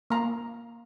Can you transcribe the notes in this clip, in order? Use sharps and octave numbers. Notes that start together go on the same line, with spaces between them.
A#3 A#5